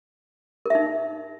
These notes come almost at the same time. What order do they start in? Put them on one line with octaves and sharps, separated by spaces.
A#4 E5 D#4